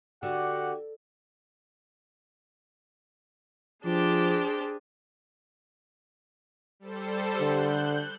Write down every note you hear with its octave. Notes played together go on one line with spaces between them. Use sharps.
D3 F#4 G4 F#5
F3 D4 G4 G#4 C5
G3 A4 C5
D3 F#6 G6